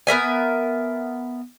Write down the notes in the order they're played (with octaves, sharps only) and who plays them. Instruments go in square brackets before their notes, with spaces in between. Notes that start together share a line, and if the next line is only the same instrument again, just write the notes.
[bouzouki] B3 A#4 E5 G#5